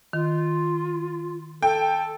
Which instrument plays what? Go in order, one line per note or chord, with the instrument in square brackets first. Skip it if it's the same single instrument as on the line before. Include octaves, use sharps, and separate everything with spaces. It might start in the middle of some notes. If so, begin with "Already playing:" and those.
[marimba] D#3 [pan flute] F4
[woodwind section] A4 [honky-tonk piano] G5